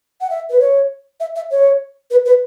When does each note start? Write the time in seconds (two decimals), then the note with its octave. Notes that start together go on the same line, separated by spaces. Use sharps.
0.21 F#5
0.30 E5
0.50 B4
0.60 C#5
1.20 E5
1.36 E5
1.51 C#5
2.11 B4
2.26 B4